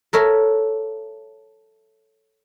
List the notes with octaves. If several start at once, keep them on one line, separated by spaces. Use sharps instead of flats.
A4 A#4 C#5 E5